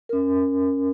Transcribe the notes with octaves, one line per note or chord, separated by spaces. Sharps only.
C#4 A#4